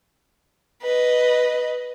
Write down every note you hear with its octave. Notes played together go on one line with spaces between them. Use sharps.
B4 D#5